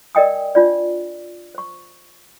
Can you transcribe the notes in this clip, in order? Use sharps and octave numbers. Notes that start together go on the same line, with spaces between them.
A#4 D5 D#5 G5 G#5 D#6
D4 F4 D5
C5 C#6